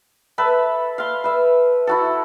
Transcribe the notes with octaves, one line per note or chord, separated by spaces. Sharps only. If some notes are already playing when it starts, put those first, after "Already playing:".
A4 B4 E5
F5 C6
B4 E5
E4 F#4 A4